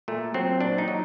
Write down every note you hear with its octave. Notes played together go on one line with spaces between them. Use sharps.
A#2 A3
F#3 C4
A#2 D4
D#4
F#3